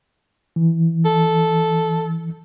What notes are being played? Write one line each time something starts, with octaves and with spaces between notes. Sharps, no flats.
E3
A4